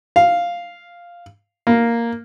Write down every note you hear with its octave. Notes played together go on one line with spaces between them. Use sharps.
F5
A#3